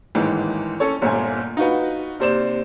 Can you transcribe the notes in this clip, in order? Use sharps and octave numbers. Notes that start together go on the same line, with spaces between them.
A1 G#2 D#3 E3
C#4 A4 C#5
G1 D2 A#2 G#5
D#4 F4 F#4 B4
D#2 C3 C5 D5 E7